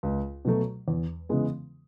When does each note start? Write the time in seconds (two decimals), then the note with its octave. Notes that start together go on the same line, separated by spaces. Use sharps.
0.03 C#2
0.45 B2 F#3 A3
0.88 E2
1.29 C#3 E3 G#3 B3